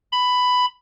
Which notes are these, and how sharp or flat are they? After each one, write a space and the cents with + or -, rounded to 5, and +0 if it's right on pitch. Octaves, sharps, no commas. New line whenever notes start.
B5 +10